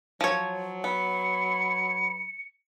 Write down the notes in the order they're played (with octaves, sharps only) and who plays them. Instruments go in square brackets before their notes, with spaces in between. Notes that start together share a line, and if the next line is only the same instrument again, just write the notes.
[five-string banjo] F3 C#5 [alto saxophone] F#3
[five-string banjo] B3 [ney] B5 [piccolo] C#7